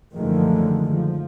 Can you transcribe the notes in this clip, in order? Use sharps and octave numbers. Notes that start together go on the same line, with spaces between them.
F#2 D3 D#3 F3 G#3 A3
F3